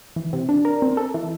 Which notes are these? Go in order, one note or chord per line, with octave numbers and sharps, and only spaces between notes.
E3
C3
D4
A#4
C4
A4
E3